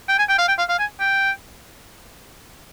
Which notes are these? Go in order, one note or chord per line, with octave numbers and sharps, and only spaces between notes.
G5
G#5
G5
F5
G5
F5
F5
G#5
G5